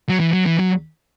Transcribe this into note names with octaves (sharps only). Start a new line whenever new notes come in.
F#3
E3
F#3
E3
F#3